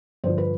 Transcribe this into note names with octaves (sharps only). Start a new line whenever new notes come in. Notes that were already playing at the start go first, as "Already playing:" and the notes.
G2 D3 F3 C5
B4